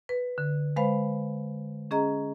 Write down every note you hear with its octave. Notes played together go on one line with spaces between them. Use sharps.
B4
D3
G#3 B4 C5 F5 B5
C#4 G#4 D#5 A#5